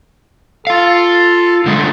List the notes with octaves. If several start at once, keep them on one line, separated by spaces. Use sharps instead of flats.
F4 A4 F5
D3 G#3 A3